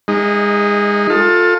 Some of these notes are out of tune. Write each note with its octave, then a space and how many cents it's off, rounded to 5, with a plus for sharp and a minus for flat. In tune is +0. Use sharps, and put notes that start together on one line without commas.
G#3 -25 D#4 +0
F4 +25 A4 +20